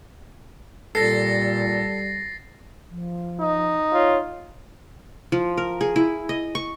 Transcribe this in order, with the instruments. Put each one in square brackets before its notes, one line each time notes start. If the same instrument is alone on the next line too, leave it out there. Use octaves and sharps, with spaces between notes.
[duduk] A#2 [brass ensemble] G3 [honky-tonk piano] A4 [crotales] A6 A#6 C7
[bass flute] F3
[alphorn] D#4
[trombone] F4 [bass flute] C#5
[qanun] F3
A#4
G#4
E4
D#5
C#6